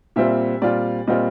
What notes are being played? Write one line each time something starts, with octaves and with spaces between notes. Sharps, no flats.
A#2 G3 C4 F4 E5
A#2 G3 C4 F4 D5
A#2 G3 C4 F4 D#5